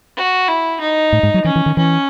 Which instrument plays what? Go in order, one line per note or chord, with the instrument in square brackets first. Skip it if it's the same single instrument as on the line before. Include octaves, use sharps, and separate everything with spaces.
[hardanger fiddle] F#4
E4
D#4
[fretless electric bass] A2
G#2
F#3
[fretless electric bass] E3 [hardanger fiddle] C#4
[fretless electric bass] E3
D#3
[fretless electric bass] E3 [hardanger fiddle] C#4